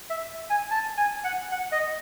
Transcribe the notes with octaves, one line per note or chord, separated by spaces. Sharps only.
E5
G#5
A5
G#5
F#5
F#5
D#5